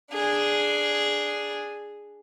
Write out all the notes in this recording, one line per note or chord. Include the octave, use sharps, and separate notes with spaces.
D4 G#4